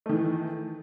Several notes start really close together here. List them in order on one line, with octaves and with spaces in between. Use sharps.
A3 D#3 E3